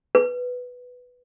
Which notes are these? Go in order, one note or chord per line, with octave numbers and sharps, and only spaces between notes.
B4